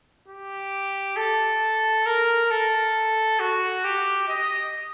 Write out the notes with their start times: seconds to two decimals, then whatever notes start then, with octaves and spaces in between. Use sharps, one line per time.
0.28 G4
1.16 A4
2.06 A#4
2.51 A4
3.39 F#4
3.84 G4
4.28 D#5